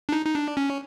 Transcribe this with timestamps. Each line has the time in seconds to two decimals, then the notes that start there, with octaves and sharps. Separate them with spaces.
0.09 D4
0.12 D#4
0.25 D#4
0.35 D4
0.57 C#4